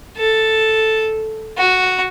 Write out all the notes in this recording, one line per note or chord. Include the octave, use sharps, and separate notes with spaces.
A4
F#4